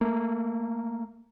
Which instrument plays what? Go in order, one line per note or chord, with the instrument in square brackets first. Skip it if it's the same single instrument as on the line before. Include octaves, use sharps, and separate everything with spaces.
[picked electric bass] A3 A#3